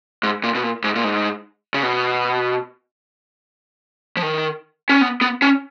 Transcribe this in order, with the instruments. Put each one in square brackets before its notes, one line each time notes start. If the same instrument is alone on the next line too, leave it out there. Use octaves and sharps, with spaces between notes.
[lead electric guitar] G#2
A#2
B2
A#2
G#2
A#2
G#2
C#3
B2
F3
D#3
C#4
B3
B3
C#4